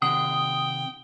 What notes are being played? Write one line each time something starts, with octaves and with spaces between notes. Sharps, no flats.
C3 D#3 F#5 G5 D#6